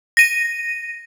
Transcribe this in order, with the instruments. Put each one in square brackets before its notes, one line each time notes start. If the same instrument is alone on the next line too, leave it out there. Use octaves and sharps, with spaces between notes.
[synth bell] A#6 D#7